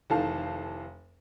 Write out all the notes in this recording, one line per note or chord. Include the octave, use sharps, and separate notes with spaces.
F1 D#3 E3 A4 F5 A5